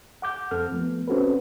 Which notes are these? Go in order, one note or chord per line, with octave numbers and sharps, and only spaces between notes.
F#5 D6 G6
F2 C4 A4 F6
F3 A3 B3
C4 C#4 F#4 A4 B4